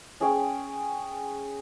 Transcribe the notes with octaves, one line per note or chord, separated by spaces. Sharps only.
C#4 G#4 C#5 G5